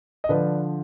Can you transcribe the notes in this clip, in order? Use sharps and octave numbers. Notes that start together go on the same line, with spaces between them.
D#5
D3 F3 B4 D5